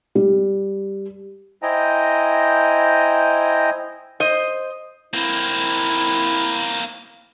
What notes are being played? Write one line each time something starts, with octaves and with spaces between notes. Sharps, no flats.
G3
E4 C5 D#5 G5 G#5 A#5
C5 D#5
A#3 C4 E4